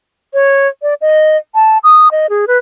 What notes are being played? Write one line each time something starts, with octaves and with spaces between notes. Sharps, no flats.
C#5
D5
D#5
A5
D#6
D#5
G#4
B4